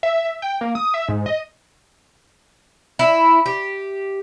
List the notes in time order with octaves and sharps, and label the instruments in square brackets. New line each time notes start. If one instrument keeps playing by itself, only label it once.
[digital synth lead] E5
G5
A#3
D#6
E5
G#2
D#5
[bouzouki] E4
G4